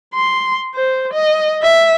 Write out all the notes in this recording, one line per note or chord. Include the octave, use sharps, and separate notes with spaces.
C6
C5
D#5
E5